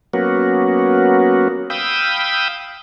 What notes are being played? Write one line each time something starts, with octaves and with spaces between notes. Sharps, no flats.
F#3 A#3 B3 C#4 F#4
F5 G5 B5 D#6 E6 G6